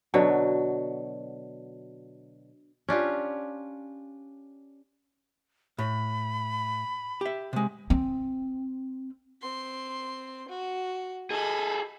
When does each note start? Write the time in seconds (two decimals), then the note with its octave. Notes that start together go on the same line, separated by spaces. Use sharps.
0.14 B2 D3 F#3
2.89 C#4 D4 F4 G4
5.78 A2 B5
7.21 G4 E5
7.53 C3 G#3
7.90 C4
9.42 C4 C6
10.48 F#4
11.31 G#4 A4 D#5 B5